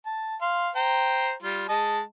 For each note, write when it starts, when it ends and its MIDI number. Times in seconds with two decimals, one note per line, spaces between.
0.06 0.35 81
0.41 0.69 77
0.41 0.69 84
0.76 1.33 72
0.76 1.33 79
0.76 1.33 82
1.43 1.68 55
1.43 1.68 65
1.69 2.01 56
1.69 2.01 75
1.69 2.01 81